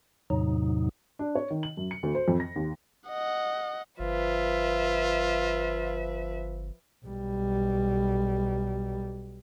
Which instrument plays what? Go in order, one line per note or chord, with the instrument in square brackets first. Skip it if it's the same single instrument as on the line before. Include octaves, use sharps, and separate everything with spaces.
[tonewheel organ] E2 A2 C3 F#3 D#4
[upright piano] D4
C#5
D#3
F#7
F#2
C#7
D2
C5
F2
A#6
D#2
[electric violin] D#5 F#5
[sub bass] G1 [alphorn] F3 [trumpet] F4 [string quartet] B4 E5
[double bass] B1 G3